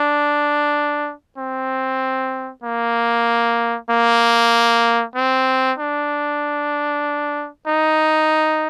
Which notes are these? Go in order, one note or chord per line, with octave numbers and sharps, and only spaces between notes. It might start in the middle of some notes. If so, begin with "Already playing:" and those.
Already playing: D4
C4
A#3
A#3
C4
D4
D#4